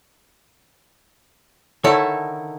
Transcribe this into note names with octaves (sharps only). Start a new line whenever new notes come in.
D3 D#3 E4 A4 C#5